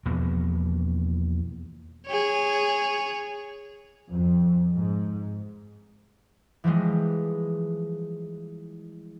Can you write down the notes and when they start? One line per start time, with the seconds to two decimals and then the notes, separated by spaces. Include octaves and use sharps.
0.06 E2 B2 F3 A#3
2.07 G#4 C#5
4.12 F2
4.73 G#2
6.64 E3 F3 G3 G#3